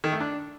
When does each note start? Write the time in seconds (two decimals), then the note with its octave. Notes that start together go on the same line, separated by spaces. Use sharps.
0.04 D#3
0.12 A3
0.20 D4